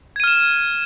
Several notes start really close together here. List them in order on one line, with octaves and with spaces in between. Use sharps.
G#6 D#7 F6 E7